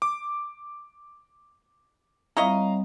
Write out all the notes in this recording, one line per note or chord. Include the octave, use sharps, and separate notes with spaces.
D6
G3 C4 E4 C#5 D#5 F5 A#5